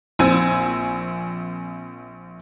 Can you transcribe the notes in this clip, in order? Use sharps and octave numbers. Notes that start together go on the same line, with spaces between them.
A#1 C4 G#5 E6